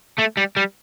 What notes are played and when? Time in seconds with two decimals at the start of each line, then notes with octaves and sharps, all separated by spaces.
0.19 A3
0.37 G3
0.56 G3